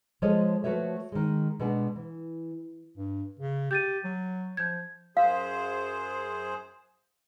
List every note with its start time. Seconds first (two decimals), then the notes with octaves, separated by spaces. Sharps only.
0.22 F3 G#3 G#4 A4 C#5 D#5
0.64 F3 A3 F#4 B4 C#5 E5
1.12 D#3 G#3
1.60 B2 G#3 B3 D4 G#4
1.96 E3
2.97 G2
3.39 C#3
3.71 G4 G6 A6 D#7
4.05 F#3
4.57 F3 G6 G#6
5.17 F#2 G#4 C5 F5